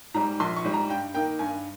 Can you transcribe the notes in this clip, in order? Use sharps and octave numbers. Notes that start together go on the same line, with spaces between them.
G#2 G3 A#5
A#1 C6
C#6
G#2 G3
A#5
G2 G5
D#3 A#3 G5
G2 G#5